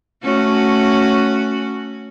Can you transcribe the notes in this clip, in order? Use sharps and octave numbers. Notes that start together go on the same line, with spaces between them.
A3 C#4 F#4